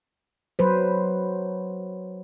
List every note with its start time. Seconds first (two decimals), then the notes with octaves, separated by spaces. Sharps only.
0.59 F#3 B4 C5